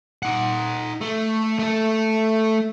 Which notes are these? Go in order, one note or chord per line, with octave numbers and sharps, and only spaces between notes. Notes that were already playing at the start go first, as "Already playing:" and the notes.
D#4 F#5
A3
A3 A4